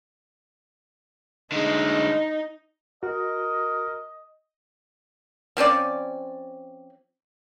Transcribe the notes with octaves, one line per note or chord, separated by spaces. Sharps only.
D3 G#3 D#4
F#4 A#4 D#5
F3 C4 C#4 D5